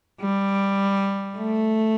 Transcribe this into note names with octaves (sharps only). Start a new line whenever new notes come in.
G3
A3